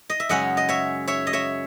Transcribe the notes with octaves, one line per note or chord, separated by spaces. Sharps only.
D#5
E5
F#2 C#3 G#3 C#4 D#5 F#5
D#5
C#5 E5
C#5 E5
D#5
C#5 E5